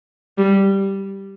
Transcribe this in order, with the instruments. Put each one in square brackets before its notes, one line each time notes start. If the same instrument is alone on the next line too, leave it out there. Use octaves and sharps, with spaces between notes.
[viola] G3